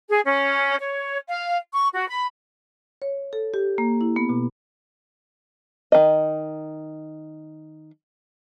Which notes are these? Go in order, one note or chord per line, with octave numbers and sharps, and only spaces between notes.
G#4
C#4
C#5
F5
C#6
F#4
B5
C#5
A4
G4
A#3
E4
B3
B2
D#3 D#5